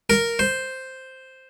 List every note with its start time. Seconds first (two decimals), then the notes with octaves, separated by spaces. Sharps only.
0.10 A#4
0.39 C5